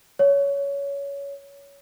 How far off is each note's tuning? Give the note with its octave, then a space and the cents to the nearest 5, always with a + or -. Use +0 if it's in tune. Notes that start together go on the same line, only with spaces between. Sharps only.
C#5 +20